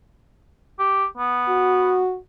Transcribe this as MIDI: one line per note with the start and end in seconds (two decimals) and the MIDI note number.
0.79 1.05 67
1.18 1.99 59
1.49 2.17 66